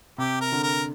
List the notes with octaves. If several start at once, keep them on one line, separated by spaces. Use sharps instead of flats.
C3 G4
A#4
D3
A#4